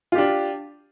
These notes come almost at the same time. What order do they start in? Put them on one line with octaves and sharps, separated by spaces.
F4 G4 D4